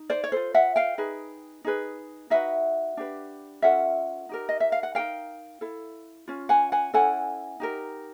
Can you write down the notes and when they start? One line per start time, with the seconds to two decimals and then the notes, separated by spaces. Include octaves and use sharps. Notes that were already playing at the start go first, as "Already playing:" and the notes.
Already playing: D#4
0.10 C5 D5
0.24 C#5
0.32 F4 A4 C5
0.54 E5 F#5
0.76 F5 G5
0.98 D#4 G#4 B4
1.65 D#4 G#4 B4
2.30 D#4 F#4 B4 E5 F#5
2.97 D4 G4 B4
3.62 C#4 F4 A4 E5 F#5
4.29 D#4 G4 A#4
4.49 D#5
4.60 E5
4.72 F5
4.83 F#5
4.95 D#4 G4 A#4 F5 G5
5.61 E4 A4
6.28 C#4 F4
6.49 F#5 G#5
6.72 F#5 G#5
6.93 C#4 E4 A4 F#5 G#5
7.60 D#4 G4 A#4